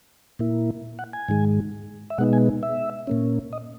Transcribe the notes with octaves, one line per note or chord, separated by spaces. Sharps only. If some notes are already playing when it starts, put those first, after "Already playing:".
A#2 A#3 E4
F#5
G#5
G#2 D#3 G#3
E5
B2 G#3 B3 D#4 F#5
G#5
E5
A#2 A#3 C#4
D#5